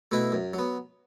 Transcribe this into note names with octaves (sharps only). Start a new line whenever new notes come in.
B2 A3 E4 B4
F#2
F#3
B3